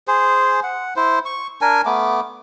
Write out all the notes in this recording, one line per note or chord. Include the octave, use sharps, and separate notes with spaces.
G#4 C5
F#5
E4 C5
C#6
D4 A#4 G#5
A3 B3 D6